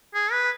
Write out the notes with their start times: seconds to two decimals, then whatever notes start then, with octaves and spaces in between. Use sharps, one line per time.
0.14 G#4
0.32 B4